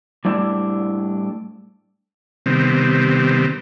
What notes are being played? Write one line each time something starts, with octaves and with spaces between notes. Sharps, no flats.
A2 G3 D4 E4
C3 D#3 G3 B3 C4